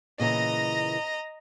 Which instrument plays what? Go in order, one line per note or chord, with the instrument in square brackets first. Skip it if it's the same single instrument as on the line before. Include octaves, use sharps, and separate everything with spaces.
[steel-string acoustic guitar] A#2 C#3 E3 [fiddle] D#5 A#5